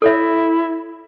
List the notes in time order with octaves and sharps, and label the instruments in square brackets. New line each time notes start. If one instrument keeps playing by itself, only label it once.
[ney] E4 [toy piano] A4 C#5 E5